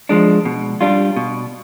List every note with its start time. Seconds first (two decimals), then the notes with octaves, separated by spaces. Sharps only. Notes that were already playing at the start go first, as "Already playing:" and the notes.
0.09 F3 G#3 D4
0.45 B2
0.81 G3 D4 F4
1.16 B2